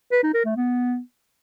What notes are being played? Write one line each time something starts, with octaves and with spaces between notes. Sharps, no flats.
B4
D#4
A#4
A3
B3